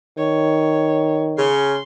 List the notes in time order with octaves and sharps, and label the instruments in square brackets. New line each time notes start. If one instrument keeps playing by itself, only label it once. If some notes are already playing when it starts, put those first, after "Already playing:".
[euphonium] D#3 [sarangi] C#5
[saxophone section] C#3 C#4 [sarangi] C6